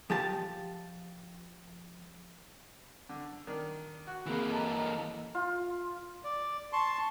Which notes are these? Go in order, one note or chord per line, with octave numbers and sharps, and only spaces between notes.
F3 G4 A5
D3
D#3 D4
F#4
E3 A#3 C4 G#4 B5
A4 D#5 A#5
F4
D5
A5 C6 C#6